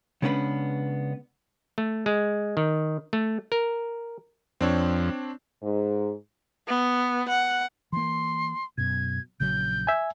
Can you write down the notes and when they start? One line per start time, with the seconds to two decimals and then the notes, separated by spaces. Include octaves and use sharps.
0.22 C#3 G#3 B3 C#4 D4 B4
1.78 A3
2.06 G#3
2.57 D#3
3.13 A3
3.52 A#4
4.61 F2 C4 D4 C#5
5.62 G#2
6.68 B3
7.29 F#5
7.93 E3 A#3 C6
8.78 F#2 B2 G#6
9.40 A#1 C#3 F#3 G6
9.87 E5 G#5